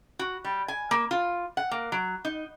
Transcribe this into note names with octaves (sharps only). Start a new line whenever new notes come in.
F#4
G3
G#5
A#3
F4
F#5
A#3
F#3
D#4